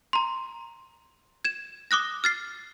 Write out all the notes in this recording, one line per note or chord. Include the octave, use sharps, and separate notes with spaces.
A#5 C6
G#6 E7
D6 D#6 F#6 A#6
F6 A6 C7